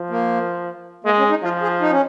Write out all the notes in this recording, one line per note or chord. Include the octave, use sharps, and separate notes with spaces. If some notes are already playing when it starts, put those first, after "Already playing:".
Already playing: F3
A#3
G#3 A#3
C#4
D#4
F3 F4
G#4
D#4
C#4